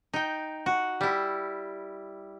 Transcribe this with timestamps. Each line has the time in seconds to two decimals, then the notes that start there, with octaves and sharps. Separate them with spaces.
0.13 D#4 G5
0.66 F#4
1.01 G3 E4